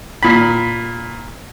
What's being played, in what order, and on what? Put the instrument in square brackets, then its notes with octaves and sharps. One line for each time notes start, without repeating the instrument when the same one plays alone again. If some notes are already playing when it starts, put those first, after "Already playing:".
[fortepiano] A#2 B5